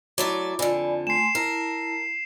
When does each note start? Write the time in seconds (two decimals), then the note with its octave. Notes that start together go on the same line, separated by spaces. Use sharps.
0.18 F#3 A3 E4 D5 B5 D6
0.59 F2 D3 D5 G#5 B5
1.07 A3 G#5 C6 C7 E7
1.35 E4 A#4 A5